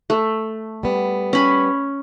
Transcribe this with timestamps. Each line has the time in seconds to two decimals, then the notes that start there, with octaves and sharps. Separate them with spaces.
0.10 A3
0.83 G3 B3
1.33 C#4 B5